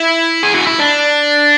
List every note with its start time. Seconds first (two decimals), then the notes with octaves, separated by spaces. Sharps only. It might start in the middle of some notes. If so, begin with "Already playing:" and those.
Already playing: E4
0.43 G#4
0.55 F#4
0.67 E4
0.80 D4